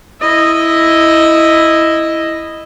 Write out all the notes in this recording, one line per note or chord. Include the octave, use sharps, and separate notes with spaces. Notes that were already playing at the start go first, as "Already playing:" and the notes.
E4 D#5